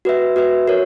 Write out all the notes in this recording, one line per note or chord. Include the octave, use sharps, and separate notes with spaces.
F#4 B4 E5
F#4 B4 E5
F#4 A#4 C#5